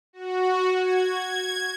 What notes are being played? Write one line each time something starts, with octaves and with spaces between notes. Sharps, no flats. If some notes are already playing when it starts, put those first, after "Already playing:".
F#4
G#6